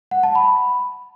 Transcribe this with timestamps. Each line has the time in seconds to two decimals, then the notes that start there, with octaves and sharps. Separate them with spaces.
0.11 F#5
0.23 A5
0.35 B5